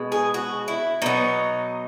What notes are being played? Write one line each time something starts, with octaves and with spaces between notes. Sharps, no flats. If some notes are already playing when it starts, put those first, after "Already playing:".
Already playing: B2 G#3
G#4
F#4
E4
B2 F#3 D#4